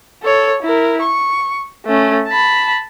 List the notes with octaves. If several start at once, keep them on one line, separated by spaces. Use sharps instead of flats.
A4 C#5
E4 A#4
C#6
A3 C#4
A5 B5